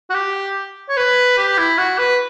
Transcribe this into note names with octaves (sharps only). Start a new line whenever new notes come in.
F#4
G4
C#5
B4
G4
E4
F#4
B4